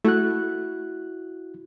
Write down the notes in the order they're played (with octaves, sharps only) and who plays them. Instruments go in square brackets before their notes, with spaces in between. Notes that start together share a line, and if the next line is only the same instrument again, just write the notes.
[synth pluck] A3 [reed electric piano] E4 F#4 F#6